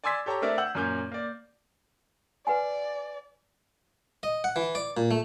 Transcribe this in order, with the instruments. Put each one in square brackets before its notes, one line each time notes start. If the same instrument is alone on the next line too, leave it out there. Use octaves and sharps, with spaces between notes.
[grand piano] D5 G#5 C6 E6 G#6 B6
G4 A4 C#5 A5 A#5
A3 C4 D4 A#4 D5 E5
F#5 E6 G6 F#7
F#2 A#2 C#4 A#4 G6
A#3 D5
[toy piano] B4 F#5 G#5 [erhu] D5
[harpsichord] D#5
F#5
E3
D5
A#2
A3